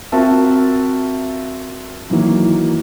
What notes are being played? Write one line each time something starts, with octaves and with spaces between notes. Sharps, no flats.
C4 F4 F#4 A#4 E5 A5
D#3 E3 F#3 A#3